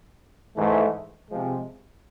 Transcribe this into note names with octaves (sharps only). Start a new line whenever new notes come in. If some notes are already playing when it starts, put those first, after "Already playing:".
G#2 E3 A3
C3 F3 G#3